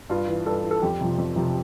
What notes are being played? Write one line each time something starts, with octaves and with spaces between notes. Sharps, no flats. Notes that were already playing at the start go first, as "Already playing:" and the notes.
G2 F4
E3
G2 A4
E3
A4
F2 G4
C3 F3
F2
C3 F3